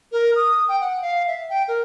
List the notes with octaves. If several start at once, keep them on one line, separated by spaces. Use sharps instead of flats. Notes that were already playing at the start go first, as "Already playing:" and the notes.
A#4
D#6
G5
F#5
F5
E5
G5
A#4